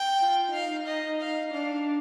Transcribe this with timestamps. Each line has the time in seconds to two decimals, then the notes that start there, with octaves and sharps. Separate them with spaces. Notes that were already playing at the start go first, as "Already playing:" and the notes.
Already playing: G5
0.20 F4
0.52 D#4 F5
0.86 D#5
1.20 F5
1.53 D4 F5